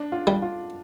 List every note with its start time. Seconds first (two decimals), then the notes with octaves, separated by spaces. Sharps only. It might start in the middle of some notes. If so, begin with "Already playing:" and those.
Already playing: D4
0.12 F4
0.27 G3
0.42 F4